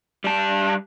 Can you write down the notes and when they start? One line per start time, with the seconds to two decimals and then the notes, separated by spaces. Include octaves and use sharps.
0.24 G3 A5